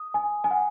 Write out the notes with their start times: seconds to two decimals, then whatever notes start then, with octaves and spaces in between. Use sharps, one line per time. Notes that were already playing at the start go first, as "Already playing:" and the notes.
Already playing: D#6
0.14 G#5
0.44 G#5
0.51 F#5